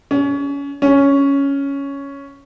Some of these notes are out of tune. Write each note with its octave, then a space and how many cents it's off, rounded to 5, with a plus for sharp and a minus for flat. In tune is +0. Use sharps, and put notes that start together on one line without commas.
C#4 +25
C#4 +5